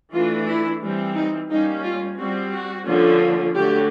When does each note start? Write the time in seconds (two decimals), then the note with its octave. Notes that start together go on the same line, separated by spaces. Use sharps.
0.12 E3 A3 D4 F4
0.47 E4
0.82 E3 G3 C4
1.16 D#4
1.50 G3 A#3 C#4 D#4
1.84 F4
2.18 G3 C4 F#4
2.53 F#4
2.88 D3 F3 A#3 C#4
3.56 D3 F#3 A3 G4